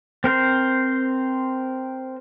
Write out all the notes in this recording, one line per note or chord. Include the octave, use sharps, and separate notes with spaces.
C4 A#4 C5